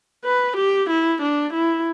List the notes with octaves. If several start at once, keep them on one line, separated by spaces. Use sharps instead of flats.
B4
G4
E4
D4
E4